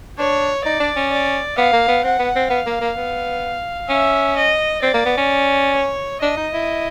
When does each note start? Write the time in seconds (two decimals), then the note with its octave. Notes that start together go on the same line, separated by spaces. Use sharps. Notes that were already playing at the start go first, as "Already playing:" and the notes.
0.19 D4 C#5
0.64 D#4 D5
0.80 D4
0.96 C#4
1.12 D5
1.58 B3 F5
1.73 A#3
1.88 B3
2.04 C4 F#5
2.19 B3
2.36 C4
2.50 B3 F5
2.67 A#3
2.81 A#3
2.97 B3
3.89 C#4 E5
4.37 D#5
4.83 C4 D5
4.94 A#3
5.06 B3
5.18 C#4
5.75 C#5
6.22 D4 D#5
6.37 D#4
6.54 E4